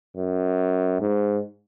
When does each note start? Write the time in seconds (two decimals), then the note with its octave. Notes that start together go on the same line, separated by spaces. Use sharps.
0.16 F#2
1.01 G#2